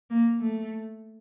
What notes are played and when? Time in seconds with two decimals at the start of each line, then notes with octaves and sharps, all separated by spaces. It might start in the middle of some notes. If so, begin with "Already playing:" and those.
0.10 A#3
0.41 A3